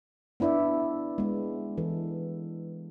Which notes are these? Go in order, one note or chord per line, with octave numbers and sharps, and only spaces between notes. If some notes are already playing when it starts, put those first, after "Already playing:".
B3 D4 E4 D5 E5
G#3 B3
E3 A4